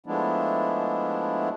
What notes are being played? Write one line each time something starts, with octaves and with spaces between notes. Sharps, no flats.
F3 G#3 A3 B3 D4 E4